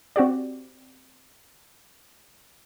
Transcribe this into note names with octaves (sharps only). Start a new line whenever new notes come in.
C4 F#4 G4 D5